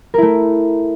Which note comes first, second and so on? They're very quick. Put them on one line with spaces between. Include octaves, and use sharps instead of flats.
A#4 E4 A3